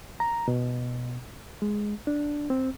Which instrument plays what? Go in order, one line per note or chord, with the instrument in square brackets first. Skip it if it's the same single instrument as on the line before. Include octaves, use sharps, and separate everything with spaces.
[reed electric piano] A#5
B2
G#3
D4
C4